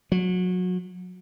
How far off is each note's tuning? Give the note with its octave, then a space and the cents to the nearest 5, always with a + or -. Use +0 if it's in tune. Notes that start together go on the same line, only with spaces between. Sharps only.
F#3 -25